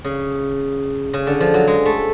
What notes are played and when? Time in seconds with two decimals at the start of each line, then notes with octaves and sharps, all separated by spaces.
0.04 C#3
1.13 C#3
1.27 D3
1.40 F3
1.54 F#3
1.67 G#3
1.85 A3